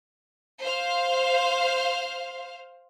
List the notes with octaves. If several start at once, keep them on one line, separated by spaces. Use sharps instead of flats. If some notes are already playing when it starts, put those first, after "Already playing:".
C5 F5